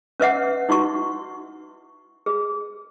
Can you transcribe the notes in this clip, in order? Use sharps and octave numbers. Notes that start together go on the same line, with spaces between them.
C#4 B4 E5 F#5
D#4 E4 F#4 C#6
G#4